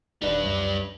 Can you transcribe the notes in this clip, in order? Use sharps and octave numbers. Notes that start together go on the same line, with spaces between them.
D#1 D#2 G3 D4 B4
C#2 F#2